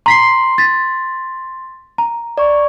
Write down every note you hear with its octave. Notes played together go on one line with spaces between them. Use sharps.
A#5 C6 B6 C7
A6 B6
A#5
D5 C#6